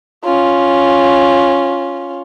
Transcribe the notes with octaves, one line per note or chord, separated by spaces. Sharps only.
C#4 F4